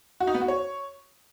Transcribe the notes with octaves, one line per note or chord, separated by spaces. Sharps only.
F#4
D#4
B3
F#4
C#5